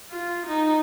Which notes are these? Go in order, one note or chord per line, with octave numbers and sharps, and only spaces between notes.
F4
D#4